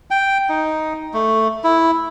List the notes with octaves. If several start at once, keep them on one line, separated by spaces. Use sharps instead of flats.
G5
D#4
A3
E4